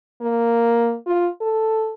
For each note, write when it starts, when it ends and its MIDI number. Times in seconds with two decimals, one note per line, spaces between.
0.21 0.95 58
1.06 1.27 65
1.41 1.94 69